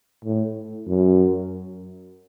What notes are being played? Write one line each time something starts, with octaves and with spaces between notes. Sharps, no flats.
A2
F#2